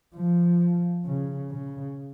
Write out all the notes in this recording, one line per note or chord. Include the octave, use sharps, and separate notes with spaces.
F3
C#3
C#3